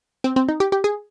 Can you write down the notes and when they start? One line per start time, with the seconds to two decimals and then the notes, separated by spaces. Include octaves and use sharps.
0.24 C4
0.36 C4
0.49 D#4
0.60 G4
0.72 G4
0.84 G#4